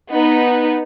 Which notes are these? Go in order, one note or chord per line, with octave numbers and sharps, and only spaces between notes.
B3 D#4